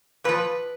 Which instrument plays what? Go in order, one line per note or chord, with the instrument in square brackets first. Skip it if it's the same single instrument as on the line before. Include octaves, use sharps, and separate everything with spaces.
[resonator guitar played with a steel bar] A#2 F3 B4